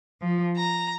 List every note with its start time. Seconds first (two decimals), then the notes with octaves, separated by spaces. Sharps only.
0.21 F3
0.56 A#5